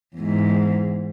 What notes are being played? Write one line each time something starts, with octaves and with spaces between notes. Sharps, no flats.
E2 G#2